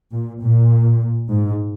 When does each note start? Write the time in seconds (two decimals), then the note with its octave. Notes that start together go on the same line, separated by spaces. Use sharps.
0.12 A#2
0.41 A#2
1.29 G#2